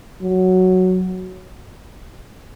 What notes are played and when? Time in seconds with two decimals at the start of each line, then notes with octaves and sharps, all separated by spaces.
0.22 F#3